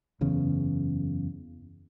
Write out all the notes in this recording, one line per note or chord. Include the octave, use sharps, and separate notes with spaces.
F#1 E2 C#3